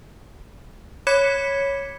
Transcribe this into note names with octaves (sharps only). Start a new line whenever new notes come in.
C#5 B5 D6 G#6 B6 C#7